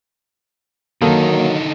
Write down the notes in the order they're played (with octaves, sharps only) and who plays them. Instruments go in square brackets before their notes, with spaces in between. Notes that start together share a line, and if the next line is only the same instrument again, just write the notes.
[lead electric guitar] D3 D#4 [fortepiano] D#3 A4 F5 [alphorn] F#3 [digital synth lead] A#3